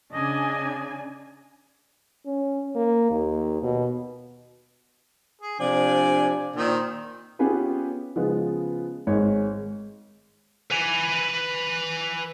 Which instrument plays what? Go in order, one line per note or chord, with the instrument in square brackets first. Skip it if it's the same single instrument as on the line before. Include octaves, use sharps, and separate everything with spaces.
[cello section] C#3 [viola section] D4 D5 G#5 [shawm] D#5
[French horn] C#4
A#3
D#2
B2
[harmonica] G#4
[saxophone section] C3 F3 D4 [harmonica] D5 G#5
[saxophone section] A#2 [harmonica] D#3 C4
[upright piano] B3 C#4 F4 G4 G#4 B4
C#3 F3 G#3 B3 F4
G#1 G#3 C#5
[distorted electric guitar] B4 G#5